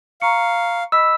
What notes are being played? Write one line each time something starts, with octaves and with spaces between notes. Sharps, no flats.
F5 A#5 C#6 C#7
D#5 B5 E6 B6